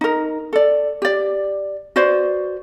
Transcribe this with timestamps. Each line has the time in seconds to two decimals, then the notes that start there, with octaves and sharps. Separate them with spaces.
0.01 D#4 A#4
0.53 A4 D5
1.02 G4 D5
1.96 F#4 B4 C5 D5